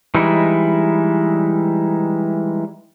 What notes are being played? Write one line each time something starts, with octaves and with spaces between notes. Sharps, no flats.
E3 G3 G#3 D#4 E4